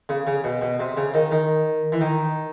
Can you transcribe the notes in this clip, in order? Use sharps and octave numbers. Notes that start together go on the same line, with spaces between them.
C#3
C#3
B2
B2
C3
C#3
D#3
D#3
E3
D#3